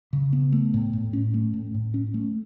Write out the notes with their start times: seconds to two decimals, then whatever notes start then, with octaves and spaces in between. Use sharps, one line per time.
0.13 C#3
0.33 B3
0.52 A3
0.74 A2
0.93 A2
1.13 C#4
1.34 A3
1.54 A2
1.74 A2
1.94 C#4
2.14 A3